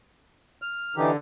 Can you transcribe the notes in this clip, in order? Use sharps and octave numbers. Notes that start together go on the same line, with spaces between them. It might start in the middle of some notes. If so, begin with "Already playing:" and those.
F6
D3 E3 D#4 G4